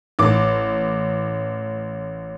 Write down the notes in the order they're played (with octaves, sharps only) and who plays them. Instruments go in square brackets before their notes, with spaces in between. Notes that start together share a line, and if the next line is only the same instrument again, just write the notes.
[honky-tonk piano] A1 D6